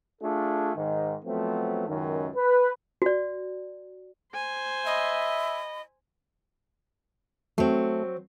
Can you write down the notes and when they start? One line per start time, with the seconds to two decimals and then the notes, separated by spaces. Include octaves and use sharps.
0.22 A3 D4 F4 G#4 A4
0.76 G#2 D#3
1.25 F3 F#3 A3 B3 C4
1.88 C#2 F#2 D#3
2.36 B4
3.02 F#4 D5
4.33 C5 G#5
4.86 D#5 E5 B5
7.58 F#3 A3 C4